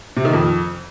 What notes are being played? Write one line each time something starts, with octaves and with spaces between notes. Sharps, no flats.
C3
D#3
F2